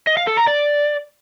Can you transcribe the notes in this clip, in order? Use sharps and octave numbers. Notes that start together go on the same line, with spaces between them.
D#5
F5
A4
A#5
D5